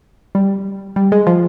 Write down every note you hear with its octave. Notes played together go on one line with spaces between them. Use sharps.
G3
G3
G#3
F3